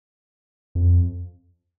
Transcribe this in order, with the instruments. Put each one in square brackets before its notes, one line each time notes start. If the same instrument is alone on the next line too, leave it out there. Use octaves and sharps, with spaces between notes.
[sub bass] F2